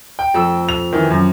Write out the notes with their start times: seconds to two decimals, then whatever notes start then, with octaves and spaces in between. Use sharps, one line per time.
0.19 G5
0.34 F2 A4 E6
0.69 F7
0.93 D#3 E3
1.10 F#2